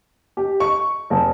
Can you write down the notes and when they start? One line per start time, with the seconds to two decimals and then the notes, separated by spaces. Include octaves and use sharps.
0.37 G4
0.60 C#6
1.10 F1